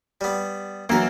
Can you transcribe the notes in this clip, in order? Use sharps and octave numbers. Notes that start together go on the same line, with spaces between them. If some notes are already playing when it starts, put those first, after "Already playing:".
G3 B3
E3 F#3 A#3 A#4